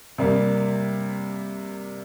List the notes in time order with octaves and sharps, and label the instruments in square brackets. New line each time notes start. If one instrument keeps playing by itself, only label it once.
[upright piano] C3 G3 A#3